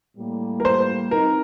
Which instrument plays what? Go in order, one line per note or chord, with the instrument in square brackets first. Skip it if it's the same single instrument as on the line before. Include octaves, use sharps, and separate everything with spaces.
[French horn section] A2 G3 A#3
[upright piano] A#4
C5
[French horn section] C4 D#4 [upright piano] A#4